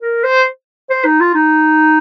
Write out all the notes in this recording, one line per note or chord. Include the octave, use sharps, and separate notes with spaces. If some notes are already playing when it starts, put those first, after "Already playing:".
A#4
C5
C5
D#4
F4
D#4